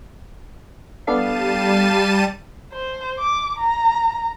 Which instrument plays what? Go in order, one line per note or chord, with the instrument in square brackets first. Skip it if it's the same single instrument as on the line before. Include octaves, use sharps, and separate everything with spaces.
[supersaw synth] G3 A5 D#7 [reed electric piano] B3 D4 A4 [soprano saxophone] F5
[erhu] C5
D6
A#5